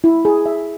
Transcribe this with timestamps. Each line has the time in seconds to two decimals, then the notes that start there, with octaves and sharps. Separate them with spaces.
0.04 E4
0.25 G#4
0.46 E5